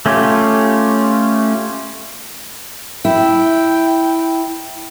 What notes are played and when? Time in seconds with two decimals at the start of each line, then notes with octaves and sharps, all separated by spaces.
0.06 A3 C#4 F4 G4
3.05 E4 G5